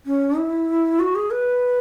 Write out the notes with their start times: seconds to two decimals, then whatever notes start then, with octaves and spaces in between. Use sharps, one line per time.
0.06 C#4
0.38 E4
0.99 F#4
1.15 G#4
1.31 B4